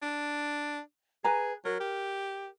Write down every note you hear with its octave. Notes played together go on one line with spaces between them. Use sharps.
D4
G#4 B4 G#5 A#5
F#3 A#4
G4